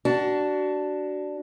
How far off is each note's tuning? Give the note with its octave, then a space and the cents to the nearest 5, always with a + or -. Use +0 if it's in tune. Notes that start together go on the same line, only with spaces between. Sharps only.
D4 +0 F#4 +30 A5 +0